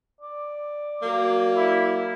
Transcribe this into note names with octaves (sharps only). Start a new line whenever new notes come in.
D5
F#3 A#3
E4